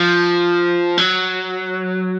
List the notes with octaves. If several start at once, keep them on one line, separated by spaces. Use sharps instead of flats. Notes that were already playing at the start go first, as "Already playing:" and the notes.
Already playing: F3
F#3